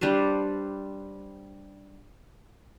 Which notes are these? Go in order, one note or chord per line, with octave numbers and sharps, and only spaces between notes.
G3 D4 B4 C5